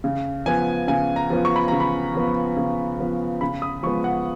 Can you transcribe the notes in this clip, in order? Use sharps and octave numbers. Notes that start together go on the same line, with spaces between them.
C#3
F3 B3 G#5
C#3 G#5
A#5
F3 B3
C#6
B5
C#3 A#5
B5
F3 B3
C#3
F3 B3
C#3 B5
D#6
F3 G#3 B3 C#6
F#5